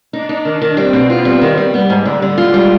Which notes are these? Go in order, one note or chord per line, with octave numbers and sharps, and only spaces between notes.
D4 D#4
D#4
D#3
D#3
G3 C4
B2
B3 F4
G3
D#3
G3
G3 B3
G#2
D3 G3
D3
G#3 F4
G3